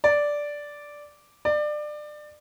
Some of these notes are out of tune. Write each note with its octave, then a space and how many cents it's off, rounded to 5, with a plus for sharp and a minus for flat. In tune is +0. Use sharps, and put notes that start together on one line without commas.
D5 -5
D5 +25